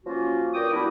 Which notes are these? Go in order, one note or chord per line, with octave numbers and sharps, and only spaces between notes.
F3 F#3 A#3 C#4 F4 F#4
G2 A#2 A#4 G5 D6 D#6
F#3 G3 A#3 B3 D4 E4